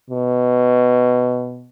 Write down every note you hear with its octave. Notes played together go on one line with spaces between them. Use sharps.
B2